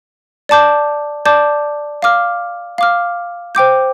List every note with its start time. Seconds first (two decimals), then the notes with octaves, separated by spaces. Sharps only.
0.49 D5 A5 D6 G6
1.26 D5 A5 D6 G6
2.02 F5 D6 F6
2.78 F5 D6 F6
3.55 C5 G5 D6 G6